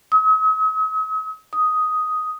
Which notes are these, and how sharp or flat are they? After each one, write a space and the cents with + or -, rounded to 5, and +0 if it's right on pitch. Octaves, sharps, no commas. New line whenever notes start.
D#6 +45
D#6 +5